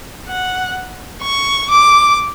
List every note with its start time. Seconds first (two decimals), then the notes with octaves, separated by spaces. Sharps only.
0.27 F#5
1.22 C#6
1.70 D6